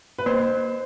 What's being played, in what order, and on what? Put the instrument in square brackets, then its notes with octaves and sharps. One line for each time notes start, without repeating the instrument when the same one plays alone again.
[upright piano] B4
[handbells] A#3 [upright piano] C5